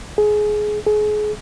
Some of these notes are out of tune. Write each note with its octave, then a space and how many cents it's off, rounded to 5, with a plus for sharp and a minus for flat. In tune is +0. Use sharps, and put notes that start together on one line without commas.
G#4 +20
G#4 +30